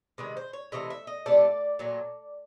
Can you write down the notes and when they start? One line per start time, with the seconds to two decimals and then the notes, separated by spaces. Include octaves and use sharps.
0.18 C3 D#3 G#3 B4
0.37 C5
0.53 C#5
0.72 C3 E3 A3 D#5
0.90 E5
1.07 D#5
1.26 C3 E3 A3 D5
1.79 A#2 F#3 A3